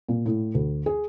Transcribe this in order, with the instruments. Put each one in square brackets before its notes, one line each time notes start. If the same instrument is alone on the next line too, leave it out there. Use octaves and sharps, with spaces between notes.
[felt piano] A#2
A2
D2
G#4